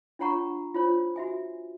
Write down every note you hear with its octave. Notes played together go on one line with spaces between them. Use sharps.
D4 F4 C#5 F#5 A#5 C#6
F4 C5 C#5
F#4 E5 G#5